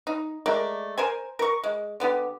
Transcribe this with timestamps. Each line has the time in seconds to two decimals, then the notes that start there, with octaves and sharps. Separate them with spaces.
0.07 D#4
0.46 G#3 A3 A#4 D5
0.98 A#4 C5 G#5
1.39 A#4 C#6
1.64 G#3
2.00 D3 B3 G4